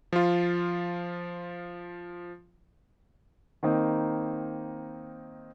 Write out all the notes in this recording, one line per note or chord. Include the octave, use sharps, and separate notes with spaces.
F3 F4
D#3 A#3 C4 D#4